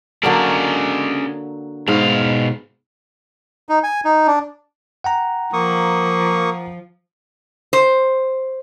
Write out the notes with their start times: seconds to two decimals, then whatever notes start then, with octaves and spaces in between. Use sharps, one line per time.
0.23 D3 F#3 A#3 C#4 G#4 D5
1.88 G#2 B2 F5
3.69 D#4
3.83 G#5
4.05 D#4
4.27 D4
5.04 F#5 G5 A#5
5.53 F3 A#3 C#6 D#6
7.73 C5